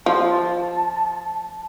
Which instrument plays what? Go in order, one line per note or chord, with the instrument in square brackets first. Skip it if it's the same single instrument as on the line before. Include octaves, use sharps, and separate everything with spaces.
[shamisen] F3 [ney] A5